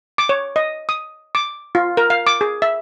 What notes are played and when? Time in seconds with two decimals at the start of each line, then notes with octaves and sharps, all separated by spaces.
0.18 D6
0.29 C#5
0.56 D#5
0.89 D#6
1.35 D6
1.75 F4
1.97 A#4
2.10 F5
2.27 D6
2.41 G#4
2.62 E5